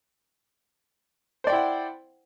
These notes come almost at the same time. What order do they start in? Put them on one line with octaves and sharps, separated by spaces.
C5 D5 G5 E4 F#5